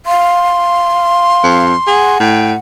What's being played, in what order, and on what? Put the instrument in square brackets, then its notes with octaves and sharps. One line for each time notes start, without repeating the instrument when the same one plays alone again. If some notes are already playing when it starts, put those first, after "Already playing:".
[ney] F5 [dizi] C6
[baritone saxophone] F2
[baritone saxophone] G#4 [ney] F#5
[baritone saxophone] A2 [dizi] G5